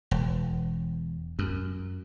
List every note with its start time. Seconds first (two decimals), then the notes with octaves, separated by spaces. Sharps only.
0.11 E1
1.39 F#2